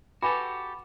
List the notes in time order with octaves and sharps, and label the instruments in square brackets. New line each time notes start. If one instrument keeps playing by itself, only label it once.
[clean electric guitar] F#4 G4 A4 [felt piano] B4 F#5 G#5 [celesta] B5 D6